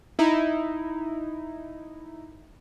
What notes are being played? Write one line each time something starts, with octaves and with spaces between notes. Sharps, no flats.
D#4 E4